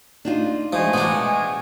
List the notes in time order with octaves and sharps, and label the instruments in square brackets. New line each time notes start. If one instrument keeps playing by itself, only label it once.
[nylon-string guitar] D4 D#4 F4
[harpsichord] F3 [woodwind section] G#3 A3 G#5
[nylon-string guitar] B2 [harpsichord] B3 D4